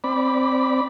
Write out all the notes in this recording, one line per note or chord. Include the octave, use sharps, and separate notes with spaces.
C4 D5 B5